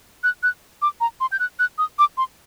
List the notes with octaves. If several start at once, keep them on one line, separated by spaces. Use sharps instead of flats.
F#6
F#6
D6
A#5
C6
G6
F#6
F#6
D#6
D6
C6